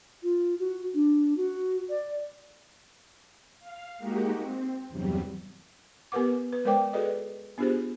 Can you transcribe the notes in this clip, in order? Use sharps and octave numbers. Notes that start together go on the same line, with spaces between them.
F4
F#4
D4
F#4
D5
F5
G#3 A#3 D#4 F#4 G4
C4
E2 G2 C3 F#3 G3
B3 G4 A#4 B4 F#5 D6
B4
G#3 A#4 C5 D5 G5 D6
F#4 G#4 A4 B4 D5 D#5
B3 D4 F4 G4 G#4 C5